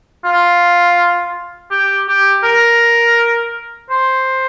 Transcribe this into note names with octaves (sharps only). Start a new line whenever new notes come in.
F4
G4
G4
A#4
C5